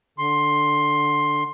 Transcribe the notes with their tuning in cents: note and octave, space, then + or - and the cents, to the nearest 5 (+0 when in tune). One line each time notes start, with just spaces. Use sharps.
D3 +0 C6 +10